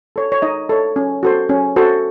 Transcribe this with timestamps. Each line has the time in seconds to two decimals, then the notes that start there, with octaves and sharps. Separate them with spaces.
0.16 A4 C#5
0.32 C#5
0.42 D#4 D#5
0.69 A4 C#5
0.96 C#4
1.23 F#4 A4 C5
1.49 C#4
1.76 F#4 A4 C5